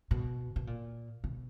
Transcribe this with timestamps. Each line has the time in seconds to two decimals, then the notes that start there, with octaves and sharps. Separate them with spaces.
0.11 B2
0.56 B2
0.67 A#2
1.24 B2